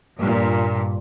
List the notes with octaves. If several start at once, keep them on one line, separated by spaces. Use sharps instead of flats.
G2 A#2